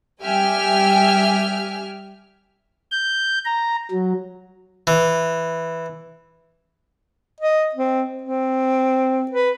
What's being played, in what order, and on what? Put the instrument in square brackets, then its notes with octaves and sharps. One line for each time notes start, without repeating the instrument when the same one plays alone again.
[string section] G3 G4 E5 G5 G#5 F6
[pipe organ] G6
A#5
F#3
[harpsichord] E3
[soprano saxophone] D#5
C4
C4
B4